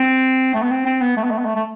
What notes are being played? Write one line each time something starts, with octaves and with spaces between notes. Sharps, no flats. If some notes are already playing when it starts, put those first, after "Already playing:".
Already playing: C4
A3
B3
C4
C4
B3
A3
B3
A3
B3
A3
A3